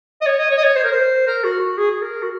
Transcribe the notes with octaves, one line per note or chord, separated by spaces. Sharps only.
D#5
C#5
D#5
C#5
D#5
C#5
C5
A#4
C5
A#4
F#4
F#4
G#4
G#4
A#4
F#4